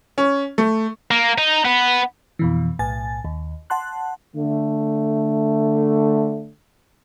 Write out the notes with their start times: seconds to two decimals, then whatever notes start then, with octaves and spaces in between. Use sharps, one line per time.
0.18 C#4
0.58 A3
1.11 A#3
1.38 D#4
1.65 B3
2.39 F2 B2 E3
2.79 B1 A2 G#5 A6
3.25 D#2
3.70 F#5 A5 C6 F#6
4.36 D3 A3